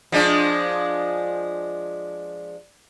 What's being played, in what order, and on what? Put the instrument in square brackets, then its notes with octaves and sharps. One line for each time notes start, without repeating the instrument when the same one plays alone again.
[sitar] F3 G#3 D4